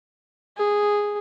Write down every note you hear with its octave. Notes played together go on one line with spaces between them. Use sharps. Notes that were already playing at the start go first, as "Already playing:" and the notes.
G#4